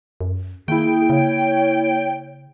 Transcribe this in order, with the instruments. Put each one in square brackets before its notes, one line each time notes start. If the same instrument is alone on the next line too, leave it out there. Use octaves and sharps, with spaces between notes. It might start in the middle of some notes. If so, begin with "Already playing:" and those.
[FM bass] F#2
[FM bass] D#3 [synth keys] A#3 E4 [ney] G#4 [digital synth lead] G5
[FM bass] C#3 [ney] C#5